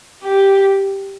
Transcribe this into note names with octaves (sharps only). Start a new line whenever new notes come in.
G4